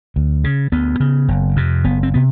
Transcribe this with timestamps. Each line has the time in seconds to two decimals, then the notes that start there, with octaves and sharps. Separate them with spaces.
0.16 D2
0.44 C#3
0.72 D2 B3
1.00 C#3
1.28 F#1
1.56 F2 C3
1.84 F#1 B3
2.03 C4
2.14 C3 B3